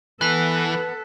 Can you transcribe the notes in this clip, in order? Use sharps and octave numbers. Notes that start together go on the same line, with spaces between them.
E3 B3 A4 B4 F#6 B6